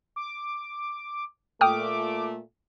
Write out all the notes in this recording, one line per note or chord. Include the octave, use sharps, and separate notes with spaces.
D6
A#2 A3 G5 D6 D#6 F6